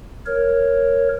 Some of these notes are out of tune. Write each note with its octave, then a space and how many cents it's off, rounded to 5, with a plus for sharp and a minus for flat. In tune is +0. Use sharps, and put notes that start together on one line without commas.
A#4 +0 C#5 -5